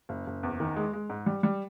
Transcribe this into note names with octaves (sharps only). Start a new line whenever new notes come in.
F#1
F#1
E2
D#3
G#3
G#3
G#2
G3
G3